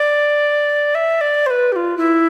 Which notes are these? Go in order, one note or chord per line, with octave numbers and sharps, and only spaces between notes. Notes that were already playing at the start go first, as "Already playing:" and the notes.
Already playing: D5
E5
D5
C5
B4
G4
F4
E4